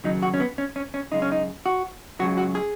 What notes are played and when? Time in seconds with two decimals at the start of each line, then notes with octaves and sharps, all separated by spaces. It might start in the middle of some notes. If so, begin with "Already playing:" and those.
0.04 D#2 C#3 F#3 D#4
0.23 F#4
0.34 C#4
0.40 B3
0.58 C#4
0.76 C#4
0.94 C#4
1.11 F#2 C#3 G#3 D#4
1.22 C#4
1.32 D#4
1.66 F#4
2.19 C#2 C#3 F#3 F#4
2.38 F#4
2.55 G#4